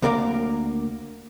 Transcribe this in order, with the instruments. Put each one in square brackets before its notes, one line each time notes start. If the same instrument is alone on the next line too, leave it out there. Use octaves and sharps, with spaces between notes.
[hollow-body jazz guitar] D2 A#3 A#4 D5 F5